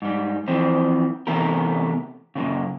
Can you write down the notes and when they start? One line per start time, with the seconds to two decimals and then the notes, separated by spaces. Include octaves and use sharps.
0.02 G#2 G3
0.48 E3 F3 C4
1.27 C3 E3 A3 B3 G4 A#4
2.35 F#2 A#2 C#3